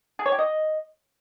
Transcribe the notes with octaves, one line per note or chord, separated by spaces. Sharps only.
G#4
C#5
G4
D#5